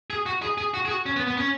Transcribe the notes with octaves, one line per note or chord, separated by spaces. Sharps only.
G#4
F#4
G#4
G#4
F#4
G#4
F#4
C#4
B3
B3
C#4